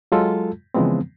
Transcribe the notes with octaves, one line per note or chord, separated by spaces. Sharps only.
F#3 G#3 F4 A4
C#3 E3 F3 G#3 B3 C4